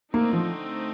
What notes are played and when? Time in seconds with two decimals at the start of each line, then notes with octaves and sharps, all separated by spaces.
0.13 D3 A3 A#3 C4 D#4
0.33 F3